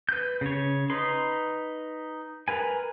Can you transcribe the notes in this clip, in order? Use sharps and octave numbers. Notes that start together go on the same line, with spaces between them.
B4 G6
C#3 C#5
D#4 B4 C6
A#4 B4 G#5